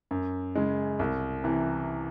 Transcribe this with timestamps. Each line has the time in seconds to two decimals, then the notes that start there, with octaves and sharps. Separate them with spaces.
0.11 F#2
0.55 C#3 G#3
0.99 C2
1.44 C3 E3